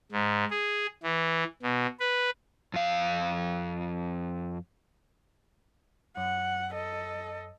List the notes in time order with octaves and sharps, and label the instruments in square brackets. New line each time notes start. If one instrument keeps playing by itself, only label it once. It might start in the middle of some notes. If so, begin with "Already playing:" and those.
[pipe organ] G#2
G#4
E3
B2
B4
[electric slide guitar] F2 F5
[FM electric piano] F#2 [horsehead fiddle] F#5
[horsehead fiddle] A4 D#5